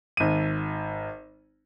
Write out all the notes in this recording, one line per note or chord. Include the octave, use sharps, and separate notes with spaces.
G#1 D#7